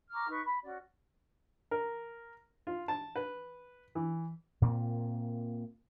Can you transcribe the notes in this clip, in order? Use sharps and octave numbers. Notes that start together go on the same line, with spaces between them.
A#5 C#6 D6 F6
D#4 B4 C#6
B5
C#4 F#4 D5
A#4
F4
A5
B4
E3
A#2 A#3 C4